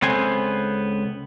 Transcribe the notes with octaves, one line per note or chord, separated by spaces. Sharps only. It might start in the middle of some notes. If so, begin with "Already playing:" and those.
C#2 B3 C4 A4 C5 G#5